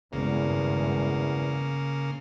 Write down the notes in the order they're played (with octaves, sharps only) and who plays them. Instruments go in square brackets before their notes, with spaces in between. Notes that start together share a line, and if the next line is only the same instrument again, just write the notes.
[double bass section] G#1 G2 [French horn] E2 [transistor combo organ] C#3 A#3